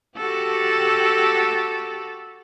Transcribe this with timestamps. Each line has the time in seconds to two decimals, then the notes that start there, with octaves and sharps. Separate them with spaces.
0.17 F#4 G4 A4